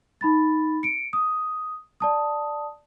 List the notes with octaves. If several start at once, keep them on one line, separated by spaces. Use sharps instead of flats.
D#4 B5 A6
C#7 D7
D#6
D5 A5 D#6